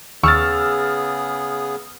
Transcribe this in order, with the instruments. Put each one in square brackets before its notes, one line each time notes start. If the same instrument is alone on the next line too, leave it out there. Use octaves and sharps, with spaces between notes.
[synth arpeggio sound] D#2 C#6 [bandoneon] C#3 B3 G#4 [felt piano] E6 F6 A6